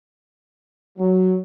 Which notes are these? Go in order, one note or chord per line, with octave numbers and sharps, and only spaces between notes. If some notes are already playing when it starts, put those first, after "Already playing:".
F#3